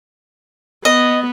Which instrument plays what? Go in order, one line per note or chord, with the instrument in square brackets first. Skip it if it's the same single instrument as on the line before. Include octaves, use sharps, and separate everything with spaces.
[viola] B3 [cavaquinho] D#5